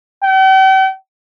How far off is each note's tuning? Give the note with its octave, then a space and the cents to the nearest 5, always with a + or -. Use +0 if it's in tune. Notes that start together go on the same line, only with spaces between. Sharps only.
G5 -45